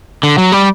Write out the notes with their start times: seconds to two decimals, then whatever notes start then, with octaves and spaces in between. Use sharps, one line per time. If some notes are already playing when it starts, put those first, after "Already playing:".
0.23 D3
0.38 F#3
0.52 G3